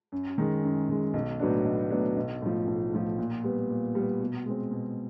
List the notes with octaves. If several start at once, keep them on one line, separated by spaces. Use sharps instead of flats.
F#2
D#3 G#3
F#2
D#3 G#3
B1
A2 F#3 B3 D4
B1
A2 F#3 B3 D4
B1
A2 F3
B1
A2 F3
A#2
G3 B3
A#2
G3 B3
B2
G#3 C4
B2